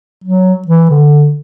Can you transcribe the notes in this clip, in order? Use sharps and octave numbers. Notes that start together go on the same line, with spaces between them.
F#3
E3
D3